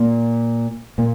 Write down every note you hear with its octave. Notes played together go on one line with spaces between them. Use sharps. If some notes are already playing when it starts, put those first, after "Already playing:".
Already playing: A#2 A#3
A#2 A#3